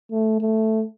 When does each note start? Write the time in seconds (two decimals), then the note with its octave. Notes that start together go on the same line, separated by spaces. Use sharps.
0.12 A3
0.41 A3